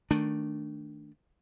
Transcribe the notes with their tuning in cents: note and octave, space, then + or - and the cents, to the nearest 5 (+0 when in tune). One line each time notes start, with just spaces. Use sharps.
D#3 +0 A3 +0 D4 +0